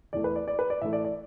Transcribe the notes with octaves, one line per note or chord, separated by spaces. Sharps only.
E2 E3 A3 D5
B4
D5
D5
B4
D5
A2 E3 A3 E5
D5
D5